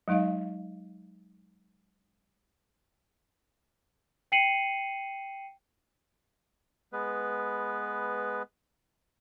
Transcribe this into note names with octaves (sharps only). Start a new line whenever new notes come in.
F#3 G#3 D#4 D#5 F5
G5 C7 C#7 D#7 F#7
G#3 B3 B4